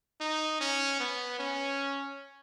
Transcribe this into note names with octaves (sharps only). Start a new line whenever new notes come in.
D#4
C#4
B3
C#4